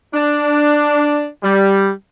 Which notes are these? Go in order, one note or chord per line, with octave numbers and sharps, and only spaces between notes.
D4
G3